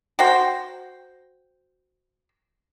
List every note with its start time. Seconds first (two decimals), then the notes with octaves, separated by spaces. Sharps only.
0.19 F#4 C5 G5